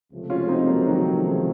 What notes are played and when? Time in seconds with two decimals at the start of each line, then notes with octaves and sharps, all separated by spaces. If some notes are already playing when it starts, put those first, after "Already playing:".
0.11 C#2 C3 F3 A3
0.30 C#4 F4
0.49 C4 D#4
0.67 F#3 A#3
0.86 D#3 F#3
1.05 D#3
1.24 C#3